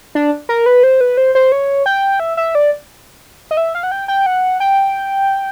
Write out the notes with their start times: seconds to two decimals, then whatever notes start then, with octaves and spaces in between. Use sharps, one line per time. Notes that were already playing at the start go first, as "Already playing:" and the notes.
0.15 D4
0.49 A#4
0.66 B4
0.83 C5
1.01 B4
1.17 C5
1.35 C5
1.52 C#5
1.86 G5
2.20 E5
2.37 E5
2.55 D5
3.51 D#5
3.57 E5
3.75 F5
3.83 F#5
3.92 G5
4.08 G5
4.26 F#5
4.60 G5